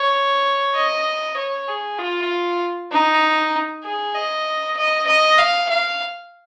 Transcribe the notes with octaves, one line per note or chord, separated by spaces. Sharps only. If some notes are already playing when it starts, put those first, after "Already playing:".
Already playing: C#5
D#5
C#5
G#4
F4
D#4
G#4
D#5
D#5
D#5
F5
F5